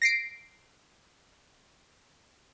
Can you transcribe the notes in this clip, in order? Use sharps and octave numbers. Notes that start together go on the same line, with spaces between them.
A#6 C7 D7